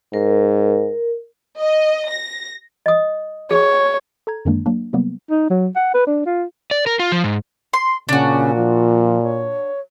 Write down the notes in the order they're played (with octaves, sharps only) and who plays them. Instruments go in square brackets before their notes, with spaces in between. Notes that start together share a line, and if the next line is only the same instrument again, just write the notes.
[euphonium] G#2 [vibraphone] A#4
[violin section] D#5
A#6
[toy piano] D#5 D#6
[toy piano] G#4 [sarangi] C#5
[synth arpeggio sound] A4 A#5 G#6
F#2 D3 D#3 G#3 A#3 D4
F#3 A#3 D4
C3 F#3 G3 A#3 B3
[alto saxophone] D#4
F#3
F#5
B4
D4
F4
[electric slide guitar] D5
A#4
F4
F3
G#2
[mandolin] C6
[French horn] A#2 [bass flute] C#3 [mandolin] D4 F#4
[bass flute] F3
C#5